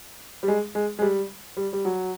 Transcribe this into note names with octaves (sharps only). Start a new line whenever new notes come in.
G3
G#3
G#3
G#3
G3
G3
G3
F#3